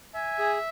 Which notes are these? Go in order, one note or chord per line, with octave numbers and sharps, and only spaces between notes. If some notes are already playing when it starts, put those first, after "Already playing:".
E5 G#5
G#4